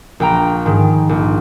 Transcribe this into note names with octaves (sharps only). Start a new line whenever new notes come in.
A#1 G5 A#5
G#2 D#3
A#1